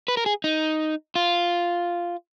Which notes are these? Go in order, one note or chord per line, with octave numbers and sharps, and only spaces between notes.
B4
A#4
G#4
D#4
F4